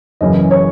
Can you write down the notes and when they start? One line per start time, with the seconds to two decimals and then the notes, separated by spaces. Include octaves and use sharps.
0.21 F#1 F#2 C#3 E3 D#5
0.51 C#5